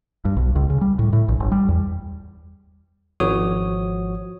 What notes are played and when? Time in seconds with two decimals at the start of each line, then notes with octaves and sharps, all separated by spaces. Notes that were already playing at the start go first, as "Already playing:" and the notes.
0.25 G2
0.37 B1
0.56 C#2
0.70 C#3
0.81 G3
0.99 A2
1.13 A2
1.28 A#1
1.40 G1
1.52 G3
1.68 E2
3.20 G#1 F3 F#4 C#5 D#6